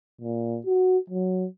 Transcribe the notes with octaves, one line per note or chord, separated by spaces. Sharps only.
A#2
F#4
F#3